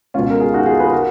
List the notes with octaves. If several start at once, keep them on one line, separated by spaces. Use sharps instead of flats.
C#2 B2 C#4 F4
A#4
F4 G#4
D#4 F#4
F4 G#4
G#4 B4
F#4 A#4